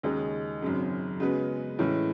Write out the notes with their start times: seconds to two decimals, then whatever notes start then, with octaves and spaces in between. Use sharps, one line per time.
0.03 D#2 C#3 G#3 D#4
0.62 G#1 F#2 C#3
1.20 C#3 G#3 B3 F#4 B4
1.79 A2 E3 G#3 C#4